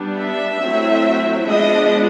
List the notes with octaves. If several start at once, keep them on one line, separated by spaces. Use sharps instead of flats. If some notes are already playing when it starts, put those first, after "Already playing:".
Already playing: G3 B3 D4
E5
F#3 A3 C4 E4
F3 G#3 B3 D4 D#5